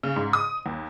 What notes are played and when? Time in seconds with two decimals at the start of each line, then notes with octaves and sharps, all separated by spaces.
0.03 C#3
0.16 G#2
0.33 D#6
0.66 D#2